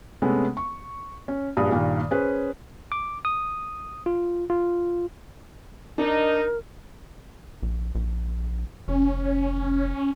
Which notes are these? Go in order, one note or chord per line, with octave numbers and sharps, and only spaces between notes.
C3 G#3 A3 B3 C#4
C#6
C#4
A#1 G2 D#6
G2 A#2 D#3
C#4 G#4 B4 C5
D6
D#6
F4
F4
D4 D#4 A#4
A#1
A#1
F1 C#4